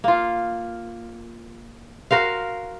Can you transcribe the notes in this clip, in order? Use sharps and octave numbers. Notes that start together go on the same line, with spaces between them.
A#3 F4
F#4 A#4 C5 F5